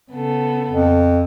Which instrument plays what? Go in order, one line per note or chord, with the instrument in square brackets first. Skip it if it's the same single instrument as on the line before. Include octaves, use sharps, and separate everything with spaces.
[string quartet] C#3 B3 A4
[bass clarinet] F2